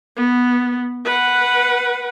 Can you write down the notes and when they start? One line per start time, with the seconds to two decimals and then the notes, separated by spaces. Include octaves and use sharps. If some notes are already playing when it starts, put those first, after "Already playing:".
0.16 B3
1.05 B4 F#5